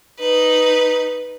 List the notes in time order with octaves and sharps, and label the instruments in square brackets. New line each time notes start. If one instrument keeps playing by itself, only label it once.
[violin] D#4 B4